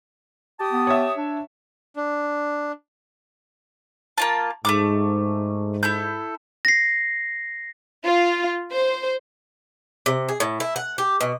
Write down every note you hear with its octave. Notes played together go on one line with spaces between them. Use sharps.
G4 A5 D#6
B3
C#5 E5
D4
D4
A#3 F4 A5
G#2 A3 B3 D6
E4 A4 G6
A#6 C7
F4
C5
C3
G#4
A2
E4
F#5
G4
B2